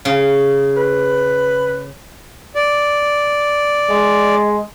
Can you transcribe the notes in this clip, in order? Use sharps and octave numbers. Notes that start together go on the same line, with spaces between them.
C#3
B4
D5
G#3